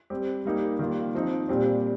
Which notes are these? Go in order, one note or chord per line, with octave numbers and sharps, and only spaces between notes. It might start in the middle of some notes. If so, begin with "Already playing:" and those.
G3 C4 G4
G3 A#3 D#4 G4
D#3 G3 A#3 F4
F3 C4 D#4
A#2 G3 C4 G4